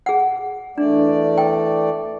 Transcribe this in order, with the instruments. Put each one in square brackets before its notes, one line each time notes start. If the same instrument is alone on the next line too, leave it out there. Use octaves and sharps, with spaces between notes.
[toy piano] G#4 F#5
[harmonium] E2 A3 D5 [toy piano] D4
[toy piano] G5